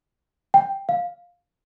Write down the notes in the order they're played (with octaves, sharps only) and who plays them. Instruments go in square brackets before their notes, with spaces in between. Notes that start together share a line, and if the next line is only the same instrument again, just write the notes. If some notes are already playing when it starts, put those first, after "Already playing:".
[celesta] G5
F5